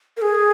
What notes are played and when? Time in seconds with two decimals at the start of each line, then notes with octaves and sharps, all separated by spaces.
0.17 A#4
0.22 G#4